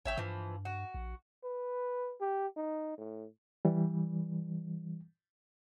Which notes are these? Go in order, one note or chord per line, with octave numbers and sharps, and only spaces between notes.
G#1 C#5 E5 G5
G2 E3 F3
F#4
A#1
B4
G4
D#4
A2
E3 G3